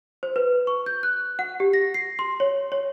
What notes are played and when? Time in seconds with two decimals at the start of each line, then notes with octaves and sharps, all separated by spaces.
0.23 C5
0.36 B4
0.67 C#6
0.86 G6
1.03 F#6
1.39 F#5
1.60 G4
1.74 A#6
1.94 C7
2.19 C6
2.40 C#5
2.72 C#5